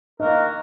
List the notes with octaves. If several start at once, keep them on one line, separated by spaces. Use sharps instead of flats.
D#3 A#3 F#4 A#4 D#5